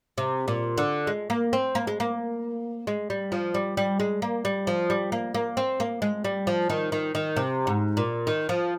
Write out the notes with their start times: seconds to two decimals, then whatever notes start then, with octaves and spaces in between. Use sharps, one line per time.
0.18 C3
0.48 A#2
0.78 D3
1.07 G#3
1.30 A#3
1.53 C4
1.75 A#3
1.87 G#3
2.00 A#3
2.87 G#3
3.10 G3
3.32 F3
3.54 G3
3.77 G3
4.00 G#3
4.22 A#3
4.45 G3
4.67 F3
4.90 G3
5.12 A#3
5.34 A#3
5.57 C4
5.80 A#3
6.02 G#3
6.24 G3
6.47 F3
6.70 D#3
6.92 D#3
7.15 D#3
7.37 C3
7.67 G#2
7.97 A#2
8.27 D#3
8.49 F3